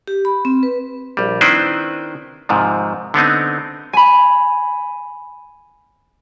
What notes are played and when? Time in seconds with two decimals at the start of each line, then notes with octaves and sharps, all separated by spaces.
0.08 G4
0.25 B5
0.45 C4
0.63 B4
1.17 A#1 G3
1.41 D#3 C4 D4 E4 B4 C5
2.49 G#2 C3 D#3 F3
3.14 D3 B3 C4 D#4
3.93 G#5 B5